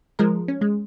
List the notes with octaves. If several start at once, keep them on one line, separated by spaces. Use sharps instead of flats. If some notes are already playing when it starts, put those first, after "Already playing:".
F3 G#3 A#4
C#4
G#3